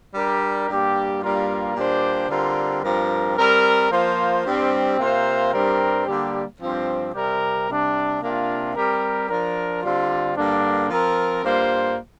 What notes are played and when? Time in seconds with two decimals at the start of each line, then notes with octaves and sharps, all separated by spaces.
0.14 G3 D4 G4 A#4
0.69 G2 G3 A#3 G4
1.22 G2 G3 A#3 F4 A#4
1.76 A#2 G3 D4 G4 C5
2.29 D3 G3 C4 F4 A#4
2.83 G2 F3 C4 A#4
3.38 G3 C4 A#4
3.91 F3 A#3 F4 C5
4.45 G2 G3 C4
4.99 C3 A#3 F4 C5
5.52 G2 G3 C4 A#4
6.06 D3 G3 A#3 G4
6.60 G2 F3 C4
7.14 C3 G3 C4 G4 A#4
7.68 C3 G3 D4
8.21 C3 A#3 D4 F4
8.75 G3 C4 G4 A#4
9.29 F3 D4 A#4
9.83 D3 G3 C4 F4
10.36 G2 D3 A#3 D4
10.90 F3 C4 A#4
11.44 G2 G3 A#3 F4 C5